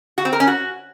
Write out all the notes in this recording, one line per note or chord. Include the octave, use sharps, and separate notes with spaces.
F#4
C4
A#4
C#4
F#4